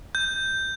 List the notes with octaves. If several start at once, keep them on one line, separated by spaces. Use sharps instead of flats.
G6